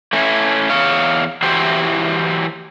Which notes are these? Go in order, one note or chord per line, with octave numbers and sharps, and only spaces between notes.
A3 C#4 E4
E2 C#5 F5
E3 E4 F#4 G4 C5